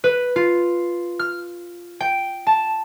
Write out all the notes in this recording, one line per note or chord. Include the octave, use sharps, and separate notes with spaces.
B4
F4
F6
G5
A5